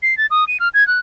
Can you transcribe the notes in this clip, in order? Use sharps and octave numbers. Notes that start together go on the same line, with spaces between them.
C7
A6
D#6
D#7
F6
G#6
F#6